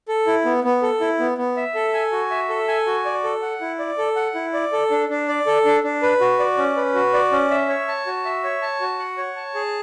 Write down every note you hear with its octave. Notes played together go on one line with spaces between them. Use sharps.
A4
E4
B3
B3
A4
E4
B3
B3
E5
A4
G#5
F#4
E5
A4
G#5
F#4
D5
A4
F#5
E4
D5
A4
F#5
E4
D5
A4
D4
D4
D5
A4
D4
D4
B4
F#4
D5
C#4
B4
F#4
D5
C#4
E5
C#5
A5
F#4
E5
C#5
A5
F#4
F#5
C#5
A5
G#4